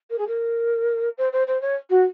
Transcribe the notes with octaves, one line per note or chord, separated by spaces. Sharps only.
A#4
G#4
A#4
C5
C5
C5
C#5
F#4